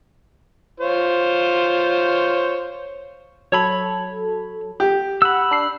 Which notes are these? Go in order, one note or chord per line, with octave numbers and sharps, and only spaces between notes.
F4 C5 C#5
F#3 A4 C#5 B5
G4
F#5 B5 E6
D4 F#6 C7